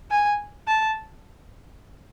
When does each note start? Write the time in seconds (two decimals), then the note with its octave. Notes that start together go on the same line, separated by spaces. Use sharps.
0.11 G#5
0.67 A5